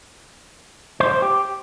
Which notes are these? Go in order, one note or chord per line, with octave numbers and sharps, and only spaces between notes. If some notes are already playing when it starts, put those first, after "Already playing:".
C5
C5
G4